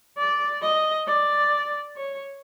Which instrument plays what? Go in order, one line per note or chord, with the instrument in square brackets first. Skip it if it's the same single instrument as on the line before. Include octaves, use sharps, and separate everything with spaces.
[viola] D5
D#5
D5
C#5